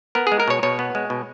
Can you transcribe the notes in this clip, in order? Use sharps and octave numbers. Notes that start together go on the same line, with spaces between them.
B3 A#4
G#3 G#4
A#4
B2 C#5
B2 C#5
B3
G#3
B2